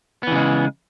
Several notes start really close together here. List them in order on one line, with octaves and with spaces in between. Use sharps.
B3 E3 C#3 G#3